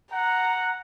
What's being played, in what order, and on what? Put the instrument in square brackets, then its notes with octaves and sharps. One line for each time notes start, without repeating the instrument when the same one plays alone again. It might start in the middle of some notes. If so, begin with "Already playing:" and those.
[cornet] F#5 [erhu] A#5